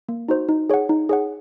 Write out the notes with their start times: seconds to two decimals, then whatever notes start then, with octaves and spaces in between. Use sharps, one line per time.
0.09 A#3
0.28 D#4 F#4 C5
0.49 D#4
0.69 G#4 C#5 F#5
0.89 D#4
1.09 G#4 C#5 F#5